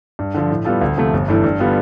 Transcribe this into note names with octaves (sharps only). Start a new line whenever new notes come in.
G2
D3 F3
A2
G3 B3 F4 A4
D2
C3 F3 A3
G1
G2 E3 A3 E4
G2
D3 G3 B3 F4